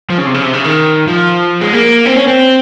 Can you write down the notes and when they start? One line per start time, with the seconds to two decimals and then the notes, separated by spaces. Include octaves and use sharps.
0.10 F3
0.18 C#3
0.26 C3
0.34 C#3
0.42 C3
0.53 C#3
0.64 D#3
1.08 F3
1.61 G#3
1.73 A#3
2.06 C4
2.17 C#4
2.28 C4